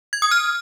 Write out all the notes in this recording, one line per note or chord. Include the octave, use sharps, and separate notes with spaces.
G#6
D#6
F6